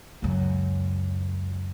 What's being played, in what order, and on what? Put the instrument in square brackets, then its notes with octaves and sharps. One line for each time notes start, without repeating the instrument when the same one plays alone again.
[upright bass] C#2 F#2